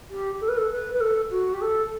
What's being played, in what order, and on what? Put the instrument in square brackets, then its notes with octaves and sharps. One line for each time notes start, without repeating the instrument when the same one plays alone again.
[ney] G4
A4
B4
A4
B4
B4
A4
F#4
G4
A4